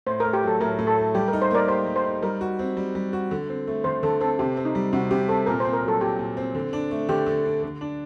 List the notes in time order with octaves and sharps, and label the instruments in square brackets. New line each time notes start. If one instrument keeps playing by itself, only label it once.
[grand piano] A2 [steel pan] C5
[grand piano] A3 [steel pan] A#4
[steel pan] G4
[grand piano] F#3 [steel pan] A4
[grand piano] A2 [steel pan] A#4
[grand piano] A2
[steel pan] A4
[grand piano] A3
[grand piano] G3 [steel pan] G4
[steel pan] A#4
[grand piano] D#4
[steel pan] C5
[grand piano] A#3 [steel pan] A#4 D5
[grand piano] G4 [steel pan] C5
[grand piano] G3
[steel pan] C5
[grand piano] D#4
[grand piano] G3 [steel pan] A#4
[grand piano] F#4
C4
G3
G3
F#4
D3
C4
A3
[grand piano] D3 [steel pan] C5
[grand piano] D3 [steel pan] A4
[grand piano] C4 [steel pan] A4
[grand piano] C3 [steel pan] G4
[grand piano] C4
[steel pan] D#4
[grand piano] G3
[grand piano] C3 [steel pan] F#4
[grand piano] C3 [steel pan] G4
[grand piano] C4 [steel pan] A4
[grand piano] A#2 [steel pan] A#4
[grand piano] C4 [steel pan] C5
[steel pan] A#4
[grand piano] F#3
[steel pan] A4
[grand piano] A#2 [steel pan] G4
[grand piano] A#2
C4
D3
D4
A3
[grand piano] D3 [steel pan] G4
[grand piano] D3
D4
D3
D4